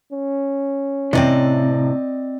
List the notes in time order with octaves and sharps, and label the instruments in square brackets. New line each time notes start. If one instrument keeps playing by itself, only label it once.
[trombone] C#4
[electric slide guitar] A2 C3 [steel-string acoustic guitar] C4 D5 D#5